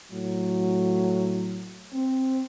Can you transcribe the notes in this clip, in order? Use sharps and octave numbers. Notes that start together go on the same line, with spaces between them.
A2 F#3
C4